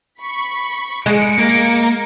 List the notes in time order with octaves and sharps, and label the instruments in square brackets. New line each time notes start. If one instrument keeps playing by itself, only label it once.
[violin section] B5 C#6
[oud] G#3 [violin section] C#7 D7
[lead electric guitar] A#3